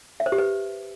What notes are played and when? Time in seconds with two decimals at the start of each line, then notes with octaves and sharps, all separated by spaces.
0.20 E5
0.26 C5
0.32 G4
0.38 B4